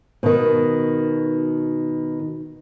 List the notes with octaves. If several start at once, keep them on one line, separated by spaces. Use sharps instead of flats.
B2 D#3